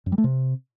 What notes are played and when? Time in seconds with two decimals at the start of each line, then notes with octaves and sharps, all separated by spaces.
0.06 F#2
0.12 G3
0.18 A3
0.24 C3